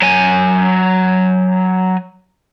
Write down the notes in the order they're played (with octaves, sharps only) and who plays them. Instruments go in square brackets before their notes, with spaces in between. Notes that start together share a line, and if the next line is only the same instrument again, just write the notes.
[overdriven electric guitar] F#3 G#5